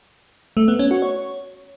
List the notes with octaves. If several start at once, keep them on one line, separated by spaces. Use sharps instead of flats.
A3
B3
C#4
F#4
C#5